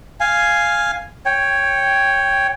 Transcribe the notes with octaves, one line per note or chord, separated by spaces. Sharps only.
F5 G#5
C#5 G5